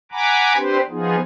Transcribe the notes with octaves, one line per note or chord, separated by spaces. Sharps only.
F#5 G#5 A#5 B5 D6
C4 D4 G4 B4 C5
F3 B3 D#4 F4 G#4